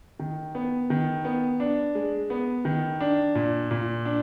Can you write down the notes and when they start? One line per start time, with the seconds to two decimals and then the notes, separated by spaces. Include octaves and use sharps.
0.19 D#3
0.55 B3
0.90 D#3
1.25 B3
1.60 D4
1.95 G#3
2.30 B3
2.65 D#3
3.00 D4
3.35 A#2
3.71 A#2
4.05 D4